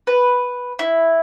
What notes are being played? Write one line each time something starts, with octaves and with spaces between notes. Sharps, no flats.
B4
E4